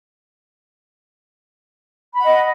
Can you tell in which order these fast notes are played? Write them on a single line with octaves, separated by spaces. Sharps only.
B5 F#5 D#5